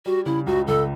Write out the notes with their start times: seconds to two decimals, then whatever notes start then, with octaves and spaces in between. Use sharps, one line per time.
0.06 G3 F#4
0.26 C#3 E4
0.46 C#2 F#4
0.67 C#2 A4